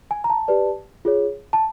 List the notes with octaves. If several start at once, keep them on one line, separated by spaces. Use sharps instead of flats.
G#5
A#5
A5
G4 B4 D5
F4 G#4 C#5
A5